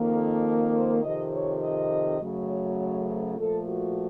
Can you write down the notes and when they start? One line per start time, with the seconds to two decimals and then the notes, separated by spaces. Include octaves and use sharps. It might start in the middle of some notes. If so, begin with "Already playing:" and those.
Already playing: F2 D#3 A#3
0.14 A4
0.73 C5
1.02 F2 C3 D#3 D#5
1.32 C#5
1.61 D#5
2.19 F#2 C#3 F#3 A3
2.49 C#5
2.79 C#5
3.08 C5
3.37 A#2 F3 A3 A4
3.68 F#4